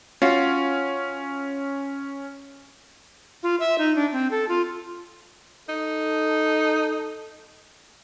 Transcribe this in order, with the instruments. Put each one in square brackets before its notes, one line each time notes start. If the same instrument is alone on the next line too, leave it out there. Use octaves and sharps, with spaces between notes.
[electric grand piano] C#4 [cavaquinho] F4 F#4
[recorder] F4
E5
D#4
D4
C4
A4
F4
[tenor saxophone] D#4 [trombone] A4